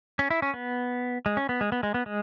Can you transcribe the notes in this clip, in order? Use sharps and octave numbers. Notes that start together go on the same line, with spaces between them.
C#4
E4
C#4
B3
G#3
C#4
B3
G#3
B3
G#3
B3
G#3